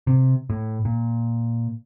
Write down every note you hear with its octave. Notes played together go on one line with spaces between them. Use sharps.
C3
A2
A#2